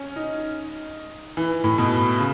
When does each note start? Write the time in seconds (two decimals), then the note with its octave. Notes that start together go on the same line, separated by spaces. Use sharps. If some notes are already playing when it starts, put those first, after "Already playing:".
Already playing: C#4
0.16 D#4
1.37 E3
1.64 A2
1.78 B2
2.18 C#3